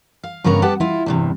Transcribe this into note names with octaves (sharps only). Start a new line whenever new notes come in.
F5
G2 C#3 B3 A#4 C#5 A#5
B3 G4 F#5 A5
E4 F4
E2 G2 C3